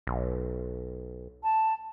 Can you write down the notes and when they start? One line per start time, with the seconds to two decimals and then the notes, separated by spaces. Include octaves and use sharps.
0.07 B1
1.43 A5